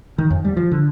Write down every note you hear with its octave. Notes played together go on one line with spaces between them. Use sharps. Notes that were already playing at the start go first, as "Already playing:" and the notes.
D#3
F2
G3
F3
D3